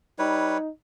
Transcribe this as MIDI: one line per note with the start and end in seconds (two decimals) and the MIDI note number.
0.19 0.58 55
0.19 0.69 63
0.19 0.58 71
0.19 0.58 73